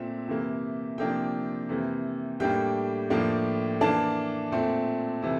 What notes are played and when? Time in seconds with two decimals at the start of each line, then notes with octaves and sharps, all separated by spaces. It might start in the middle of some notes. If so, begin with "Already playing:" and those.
Already playing: A#2 A3 C4 E5
0.28 C3 E3 A#3
0.98 C3 F3 A#3 D4 G5
1.69 C3 E3 A#3
2.40 A2 G3 A#3 D4 G5
3.10 A2 F3 A#3 D4
3.81 E3 A#3 D4 A5
4.52 A#2 A3 C4
5.22 C3 E3 A3